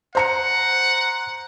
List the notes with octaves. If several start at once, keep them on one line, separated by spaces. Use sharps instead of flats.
C5 F#5 A#5 C#7